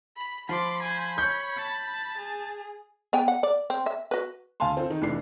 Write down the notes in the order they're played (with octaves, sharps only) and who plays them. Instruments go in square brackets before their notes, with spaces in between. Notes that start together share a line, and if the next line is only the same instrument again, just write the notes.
[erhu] B5
[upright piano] F3 [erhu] B5 [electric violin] C6 D6
[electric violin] C5 G#5
[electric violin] C#5 [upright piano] G6
[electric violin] A5
[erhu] G#4
[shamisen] B3 G5 G#5
F#5
D5
C4
E5
F#4 B4
[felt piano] D2 F5 G#5 A5 C6
C4 F4 A4
D#3 D#4
F1 E3 D4 C7